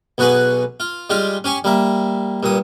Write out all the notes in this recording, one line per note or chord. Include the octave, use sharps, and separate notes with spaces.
B1 B3 F#4 G#4 B4
F4
G3 G#3 F4 G4
C#4 G4 G#5 C#6
G3 A#3 E5
G2 A#2 D#6